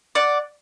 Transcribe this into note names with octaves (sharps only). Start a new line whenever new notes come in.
D5 F#5